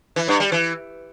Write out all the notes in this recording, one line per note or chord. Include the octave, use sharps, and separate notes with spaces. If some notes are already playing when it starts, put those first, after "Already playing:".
E3
G2
G3
E3